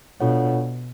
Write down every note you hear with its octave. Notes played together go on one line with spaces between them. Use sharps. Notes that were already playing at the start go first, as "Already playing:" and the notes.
B2 D4 F4 A4 C#5 F#5